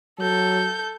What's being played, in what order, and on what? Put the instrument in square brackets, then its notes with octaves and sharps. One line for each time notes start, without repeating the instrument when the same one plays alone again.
[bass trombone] F#3 [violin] A4 G6